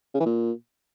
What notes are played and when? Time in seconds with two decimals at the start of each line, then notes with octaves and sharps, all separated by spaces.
0.14 C#3
0.20 E3
0.25 A#2